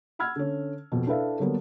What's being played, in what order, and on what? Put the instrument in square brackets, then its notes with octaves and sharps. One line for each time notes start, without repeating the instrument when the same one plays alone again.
[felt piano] F#5 B5 E6 F6 G#6
D3 C#4
F2 B2
D4 E4 A4 B4 E5 F5
D3 F#3 G3 A#3 B3 D4